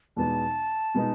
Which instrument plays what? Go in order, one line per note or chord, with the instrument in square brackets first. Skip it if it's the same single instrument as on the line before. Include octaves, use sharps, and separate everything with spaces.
[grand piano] E2 B2 G#3 B3 D#4 [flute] A5
[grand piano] B2 G#3 B3 D#4